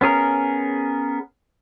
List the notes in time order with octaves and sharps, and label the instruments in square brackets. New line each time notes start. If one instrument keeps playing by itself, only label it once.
[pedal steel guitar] B3 C#4 G#4 A#4